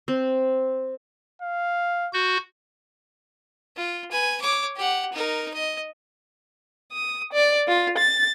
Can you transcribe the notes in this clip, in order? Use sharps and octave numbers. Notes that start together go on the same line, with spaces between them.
C4
F5
F#4 G6
F4
B4 G#5
C#5 D6
G4 F#5
D#4 A#4
D#5
D#6
D5
F4
A6